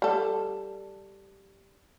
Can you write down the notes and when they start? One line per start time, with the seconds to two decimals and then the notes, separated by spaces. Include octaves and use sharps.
0.02 G3 A4